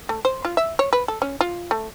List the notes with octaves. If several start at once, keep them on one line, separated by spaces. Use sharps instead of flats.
A3
C5
F4
E5
C#5
B4
A4
C#4
F4
A3